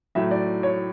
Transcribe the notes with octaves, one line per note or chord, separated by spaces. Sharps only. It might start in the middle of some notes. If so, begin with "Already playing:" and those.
A2 F#3 A3 E5
D5
C#5